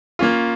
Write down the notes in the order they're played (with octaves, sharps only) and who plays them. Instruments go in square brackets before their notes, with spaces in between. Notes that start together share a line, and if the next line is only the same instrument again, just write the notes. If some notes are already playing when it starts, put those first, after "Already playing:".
[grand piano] A#3 C#4 F4